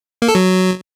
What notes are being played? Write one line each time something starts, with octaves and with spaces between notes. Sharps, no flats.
A#3
A4
F#3